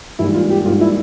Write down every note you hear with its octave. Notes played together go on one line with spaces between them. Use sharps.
G#2 E3 G3 A#3 E4
F4
G4
G#2 E3 G3 A#3 F4
E4